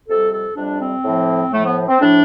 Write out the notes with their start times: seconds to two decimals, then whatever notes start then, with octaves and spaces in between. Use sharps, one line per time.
0.09 F2 C3 G3 A4
0.32 A4
0.56 F2 C3 G3 D4
0.80 C4
1.05 A2 F3
1.52 A2 F3 A3
1.64 B3
1.88 C4
2.00 A2 F3 D4